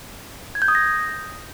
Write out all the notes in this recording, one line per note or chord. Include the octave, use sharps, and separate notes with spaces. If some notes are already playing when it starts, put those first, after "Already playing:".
G#6
G6
D#6
A#6